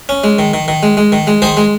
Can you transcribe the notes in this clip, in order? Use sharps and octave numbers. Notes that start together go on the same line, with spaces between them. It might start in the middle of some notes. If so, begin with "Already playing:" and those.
C#4
G#3
D#3
D#3
D#3
G#3
G#3
D#3
G#3
D#3 G#4 C5
G#3